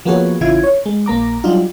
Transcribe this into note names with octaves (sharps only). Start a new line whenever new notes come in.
F3 A#3 B3 F#4 G#4 C#5
A1 C#3 E3 E4 F4 G#6
C#5
G#3
A#1 A#3 A#5 D6
F#3 G3 D4 D#4 F4